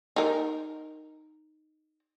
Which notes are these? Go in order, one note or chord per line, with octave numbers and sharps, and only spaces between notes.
D#4 A#4